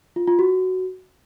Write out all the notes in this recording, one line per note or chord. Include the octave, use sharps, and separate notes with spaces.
F4
F4
F#4